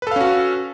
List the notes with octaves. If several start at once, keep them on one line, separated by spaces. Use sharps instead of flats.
C#4 F#4 A4 B4 F5